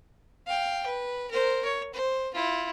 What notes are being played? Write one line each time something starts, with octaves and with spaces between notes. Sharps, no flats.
F5 G5
B4
A#4 C5
C#5
C5
E4 F4